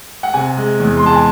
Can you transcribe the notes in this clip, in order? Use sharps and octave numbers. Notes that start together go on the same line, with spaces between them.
F#5
C3 G#5
G#3
E2
C6
G#3 A5
G#5